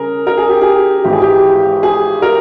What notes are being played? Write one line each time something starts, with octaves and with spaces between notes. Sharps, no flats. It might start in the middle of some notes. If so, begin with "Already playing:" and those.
Already playing: C#3 G3 G#4 A#4
A#4
G#4
G4
G#4
G#1 G#2 E3 G#3 G4
G#4
G4
G#4
A#4